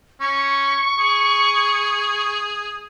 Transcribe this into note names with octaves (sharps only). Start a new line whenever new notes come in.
C#4 C#6
G#4